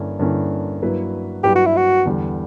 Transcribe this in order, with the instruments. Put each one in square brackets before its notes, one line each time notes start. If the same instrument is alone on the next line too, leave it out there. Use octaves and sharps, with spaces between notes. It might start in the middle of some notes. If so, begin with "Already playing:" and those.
Already playing: [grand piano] G2 D3 A#3 C#4 E4
G2 D3 A#3 C#4 E4
G2 F#3 A#3 E4 B4
[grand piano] G2 F#3 A#3 E4 B4 [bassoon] G4
[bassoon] F#4
E4
F#4
[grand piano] E2 D3 G3